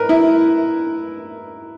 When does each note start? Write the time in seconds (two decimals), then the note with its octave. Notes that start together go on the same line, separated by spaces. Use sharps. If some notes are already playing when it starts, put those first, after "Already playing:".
Already playing: A#4 B4
0.09 E4